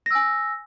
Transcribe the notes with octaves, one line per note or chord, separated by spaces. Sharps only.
G#5 E6 A#6